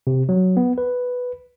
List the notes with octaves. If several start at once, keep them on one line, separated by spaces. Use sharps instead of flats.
C3
F#3
B3
B4